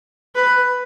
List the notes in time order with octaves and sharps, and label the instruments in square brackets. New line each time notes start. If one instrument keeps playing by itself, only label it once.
[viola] B4